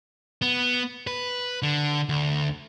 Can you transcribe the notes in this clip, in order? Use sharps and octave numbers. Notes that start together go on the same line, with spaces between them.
B3
B4
D3
D2